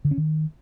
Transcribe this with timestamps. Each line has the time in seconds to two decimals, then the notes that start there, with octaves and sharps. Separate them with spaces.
0.05 D3
0.11 C#4
0.18 D#3